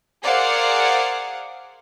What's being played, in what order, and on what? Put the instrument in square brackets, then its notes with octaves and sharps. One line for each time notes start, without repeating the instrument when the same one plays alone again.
[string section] G#4 A#4 C5 D5 F5 F#5